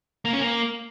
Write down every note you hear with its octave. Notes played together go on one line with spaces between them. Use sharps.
A#3
C#4
A#3